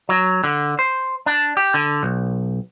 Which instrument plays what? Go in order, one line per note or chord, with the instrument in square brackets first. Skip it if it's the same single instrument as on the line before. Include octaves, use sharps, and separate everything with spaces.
[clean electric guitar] F#3
D3
C5
D4
G4
D3
B1